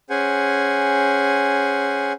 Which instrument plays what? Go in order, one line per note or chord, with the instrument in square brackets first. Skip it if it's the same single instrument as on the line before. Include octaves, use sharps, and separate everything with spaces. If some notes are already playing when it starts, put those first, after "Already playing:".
[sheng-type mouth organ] C#4 G#4 C5 F#5 G#5